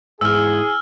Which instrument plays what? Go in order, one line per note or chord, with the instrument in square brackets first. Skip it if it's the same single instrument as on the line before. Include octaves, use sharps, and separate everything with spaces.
[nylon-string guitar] E2 G#2 [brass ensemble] G#4 [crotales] E6 F6